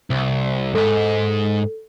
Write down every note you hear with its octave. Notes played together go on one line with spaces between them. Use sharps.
C2
G#2 G#3 A4